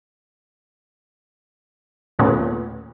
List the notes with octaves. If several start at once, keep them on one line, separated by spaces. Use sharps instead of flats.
D#2 A#2 A3 B3 C#4